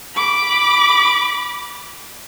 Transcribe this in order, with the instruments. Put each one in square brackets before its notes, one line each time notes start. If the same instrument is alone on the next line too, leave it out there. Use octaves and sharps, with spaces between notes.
[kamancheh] B5 D6